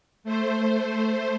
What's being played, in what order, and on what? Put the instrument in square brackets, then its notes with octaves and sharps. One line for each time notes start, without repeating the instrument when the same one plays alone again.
[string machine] A3 C5